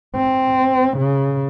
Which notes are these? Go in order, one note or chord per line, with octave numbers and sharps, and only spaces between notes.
C4
C#3